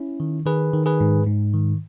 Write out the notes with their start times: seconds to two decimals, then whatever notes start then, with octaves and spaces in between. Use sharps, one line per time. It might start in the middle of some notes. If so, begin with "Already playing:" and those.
Already playing: C#4 E4
0.20 D#3
0.46 D#3 G#4 B4
0.73 D#3
0.86 G#4 B4
1.00 G#2
1.27 G#2
1.54 D#3